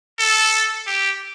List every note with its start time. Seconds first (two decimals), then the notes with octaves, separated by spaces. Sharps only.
0.19 A4
0.86 G4